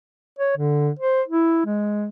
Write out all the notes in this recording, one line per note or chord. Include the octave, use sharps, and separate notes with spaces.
C#5
D3
C5
E4
G#3